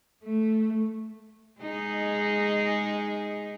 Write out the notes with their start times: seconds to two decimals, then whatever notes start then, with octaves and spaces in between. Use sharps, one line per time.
0.23 A3
1.61 G#3 D#4 G#4